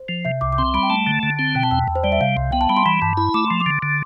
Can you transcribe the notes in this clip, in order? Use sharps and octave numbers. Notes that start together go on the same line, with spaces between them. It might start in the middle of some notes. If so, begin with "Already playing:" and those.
Already playing: C5
F3
C3 E5
C2 D6
D6
C4 C6
G3 B5
G5
A3 A5
D3
D3
C4
B2 G5
A5
E2 G5
E2
C5
G3 D5
E5
C3 F5
C2
B3 G5
A5
G3 B5
C6
E3 B5
G2 A5
E4 B5
A3 D6
F3 C6
D6
D3
D3